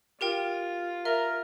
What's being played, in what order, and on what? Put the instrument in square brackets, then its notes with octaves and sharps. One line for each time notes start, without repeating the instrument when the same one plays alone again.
[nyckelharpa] F4 [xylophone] G4 A#4 G5
[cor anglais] A#4 [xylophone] E5 G7